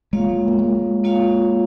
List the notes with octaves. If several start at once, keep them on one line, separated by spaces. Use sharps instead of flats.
G#3 A#3 F4 C#5 F5
A#3
G#3
A#3 F4 C#5 F5